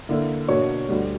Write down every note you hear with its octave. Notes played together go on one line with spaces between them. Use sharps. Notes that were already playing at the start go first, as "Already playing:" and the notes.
D3 A#3 E4
B2 A#3 D4 F#4 C#5
D2 D3 G3